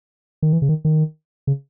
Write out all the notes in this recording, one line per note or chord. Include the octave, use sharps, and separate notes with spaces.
D#3
E3
C#3
D#3
D#3
C#3